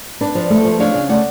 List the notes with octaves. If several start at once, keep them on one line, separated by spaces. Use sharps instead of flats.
D4 B4 D5
F3
A3
F3
D4 C#5 F5
C#3
A3 D5 F#5